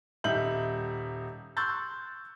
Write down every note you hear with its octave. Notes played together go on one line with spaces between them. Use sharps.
D#1 G3 D#4 E5 G6 F#7
C6 C#6 E6 F#6 G6 A6